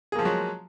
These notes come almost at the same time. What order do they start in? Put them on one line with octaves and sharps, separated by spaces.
G#4 A#3 F3 G#3 F#3